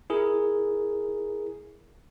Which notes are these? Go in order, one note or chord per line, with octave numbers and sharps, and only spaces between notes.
E4 G#4 A#4